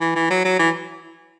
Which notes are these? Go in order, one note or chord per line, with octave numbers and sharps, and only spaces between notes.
E3
E3
F#3
F#3
E3